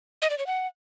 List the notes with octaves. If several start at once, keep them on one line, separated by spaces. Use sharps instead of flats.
D#5
D5
C#5
F#5